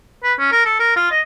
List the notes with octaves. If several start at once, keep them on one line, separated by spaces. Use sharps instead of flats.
B4
C#4
A#4
A4
A#4
F4
D#5